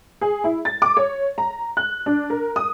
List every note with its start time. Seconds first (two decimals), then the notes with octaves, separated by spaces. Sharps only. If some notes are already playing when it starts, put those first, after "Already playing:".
0.21 G#4
0.44 E4
0.65 A6
0.82 D6
0.97 C#5
1.38 A#5
1.77 F#6
2.06 D4
2.30 A#4
2.56 D#6